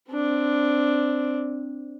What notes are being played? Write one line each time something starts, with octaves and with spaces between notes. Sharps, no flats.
C4 D4